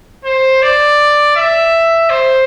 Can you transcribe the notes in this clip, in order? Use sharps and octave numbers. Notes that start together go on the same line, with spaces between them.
C5
D5
E5
C5